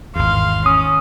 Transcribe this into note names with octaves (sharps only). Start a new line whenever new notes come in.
G#1 E2 F5 C6
C#4 D#6